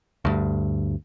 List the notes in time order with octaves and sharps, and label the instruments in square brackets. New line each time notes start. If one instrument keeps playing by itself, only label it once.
[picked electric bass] D2 G2